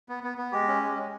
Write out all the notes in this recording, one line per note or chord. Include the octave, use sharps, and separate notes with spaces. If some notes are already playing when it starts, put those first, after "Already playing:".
B3
B3
B3
G#3 G4
C#4
G#3
G#3